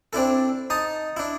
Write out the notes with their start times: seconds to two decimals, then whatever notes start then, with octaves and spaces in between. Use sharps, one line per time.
0.13 C4 D4 E4 A4
0.70 D#4 A5 D#6
1.17 D4 E4